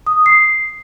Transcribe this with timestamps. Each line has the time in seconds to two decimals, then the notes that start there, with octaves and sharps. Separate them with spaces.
0.07 D#6
0.26 C7